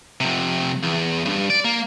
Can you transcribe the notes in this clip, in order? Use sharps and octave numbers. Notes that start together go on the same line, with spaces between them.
F2 C3
E2
B1 G2
D5
A#3